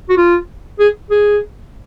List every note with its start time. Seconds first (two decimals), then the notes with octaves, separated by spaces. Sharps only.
0.09 F#4
0.17 F4
0.79 G#4
1.11 G#4